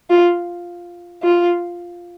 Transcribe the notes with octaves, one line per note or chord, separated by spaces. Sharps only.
F4
F4